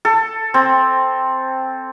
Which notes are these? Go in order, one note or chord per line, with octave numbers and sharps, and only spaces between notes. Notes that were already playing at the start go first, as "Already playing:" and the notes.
A4
C4